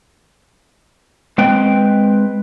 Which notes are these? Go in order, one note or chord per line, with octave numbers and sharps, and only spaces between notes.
G#3 C4 B4 G5